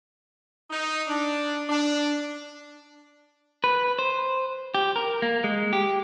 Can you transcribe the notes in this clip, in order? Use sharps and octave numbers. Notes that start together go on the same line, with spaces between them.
D#4
D4
D4
B4
C5
G4
A#4
A#3
G#3
G4